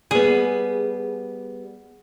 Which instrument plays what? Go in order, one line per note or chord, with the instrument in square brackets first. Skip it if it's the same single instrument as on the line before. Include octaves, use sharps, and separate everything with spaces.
[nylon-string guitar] G3 B3 [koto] G#4